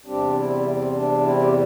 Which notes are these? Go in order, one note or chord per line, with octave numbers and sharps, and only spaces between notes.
E2 C3 G3 C4 D4 G4
C4 E4
C4
D4
C4 E4
G4